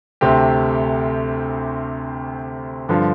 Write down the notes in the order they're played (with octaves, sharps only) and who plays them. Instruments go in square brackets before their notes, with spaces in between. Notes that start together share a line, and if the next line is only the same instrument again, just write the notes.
[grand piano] D2 C3 A3 C4 G4
G2 D3 F3